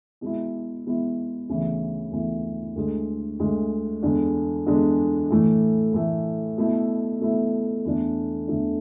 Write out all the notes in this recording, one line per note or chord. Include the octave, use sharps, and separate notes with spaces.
B2 G#3 B3 E4
B2 G#3 B3 E4
D2 C#3 E3 B3 E4
D2 C#3 E3 B3 E4
D2 D3 G#3
D2 D3 G#3
E2 D3 G#3 D4
E2 D3 G#3 D4
A2 E3 A3
A2 E3 A3
B2 A3 E4
B2 A3 E4
E2 D3 A3 D4
E2 D3 A3 D4